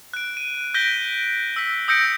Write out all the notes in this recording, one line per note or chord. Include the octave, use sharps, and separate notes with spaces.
F#6 D7
D#7
F#6 G6 A#6 B6 D7 G7
E6 B6
D#6 E6 G6 A#6 C#7 D7